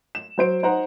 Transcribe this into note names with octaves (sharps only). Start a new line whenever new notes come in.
E7
F#3 C5 D7
D#4 C5 F#5 A#5